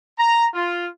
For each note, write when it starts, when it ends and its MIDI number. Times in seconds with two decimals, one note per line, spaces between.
0.18 0.46 82
0.53 0.87 65